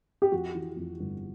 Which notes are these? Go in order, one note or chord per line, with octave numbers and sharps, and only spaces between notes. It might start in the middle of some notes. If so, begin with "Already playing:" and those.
G4
F2 F#4
E3
F2
G1